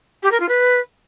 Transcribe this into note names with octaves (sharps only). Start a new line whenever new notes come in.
G4
A#4
F4
B4